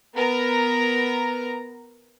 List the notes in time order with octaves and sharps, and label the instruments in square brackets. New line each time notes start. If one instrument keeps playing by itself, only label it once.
[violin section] B3 A#4 A#5